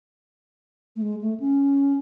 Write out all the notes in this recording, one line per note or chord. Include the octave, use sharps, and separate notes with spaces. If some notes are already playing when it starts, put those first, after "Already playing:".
A3
G#3
A3
C#4